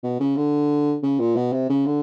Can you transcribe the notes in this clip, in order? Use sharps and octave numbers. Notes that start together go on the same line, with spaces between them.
B2
C#3
D3
C#3
A#2
B2
C3
C#3
D3